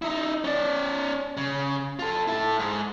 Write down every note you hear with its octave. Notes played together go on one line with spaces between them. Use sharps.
D#4 E4
C#4 D5
C#3
F4 A4
E4 A4
G#2